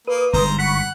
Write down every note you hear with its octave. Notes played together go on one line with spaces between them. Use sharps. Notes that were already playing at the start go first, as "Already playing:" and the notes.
A#3 B4 D#6
G1 G#2 C5 A#5
F#5 B5 C#6